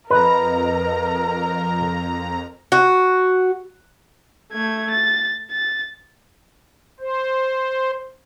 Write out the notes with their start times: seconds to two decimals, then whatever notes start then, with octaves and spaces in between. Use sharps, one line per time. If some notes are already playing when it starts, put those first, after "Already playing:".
0.10 F2 A#4 B4 D#5 A#5
2.72 F#4
4.52 A3 G#6
4.90 A6
5.51 A6
7.00 C5